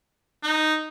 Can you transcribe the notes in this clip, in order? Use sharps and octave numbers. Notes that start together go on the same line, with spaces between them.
D#4